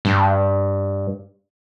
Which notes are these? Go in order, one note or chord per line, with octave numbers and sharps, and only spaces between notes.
G2